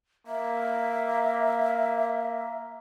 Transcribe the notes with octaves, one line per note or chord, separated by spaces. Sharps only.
A#3 E5